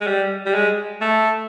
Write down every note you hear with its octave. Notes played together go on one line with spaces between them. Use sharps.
G#3
G3
G3
G#3
A3